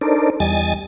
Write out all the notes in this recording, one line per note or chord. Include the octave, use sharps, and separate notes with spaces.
D4 D#4 A4 A#4 C5 D5
E2 G3 D#5 G#5 A6